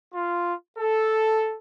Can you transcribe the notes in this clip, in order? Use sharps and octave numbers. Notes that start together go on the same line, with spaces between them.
F4
A4